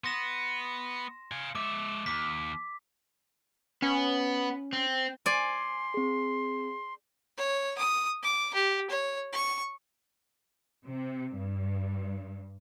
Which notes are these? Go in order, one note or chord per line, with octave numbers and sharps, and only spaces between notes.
B3 C6 A#6 E7
F5 G#5
G#3 E5 D6
D#2 D6 B6
B3 C#4
C4
D5 G#5 C6
C4 G#4
C#5
D#6
D6
G4
C#5
C#6
C3
G2